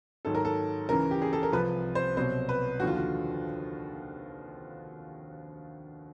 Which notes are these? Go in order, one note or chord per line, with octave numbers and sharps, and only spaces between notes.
G#2 D#3 F#3 A4
A#4
A4
C#2 C#3 E3 A#4
G4
G#4
A4
A#4
C2 C3 F3 B4
C5
C2 B2 F#3 C5
B4
D#2 D3 F3 F#4
F4
F#4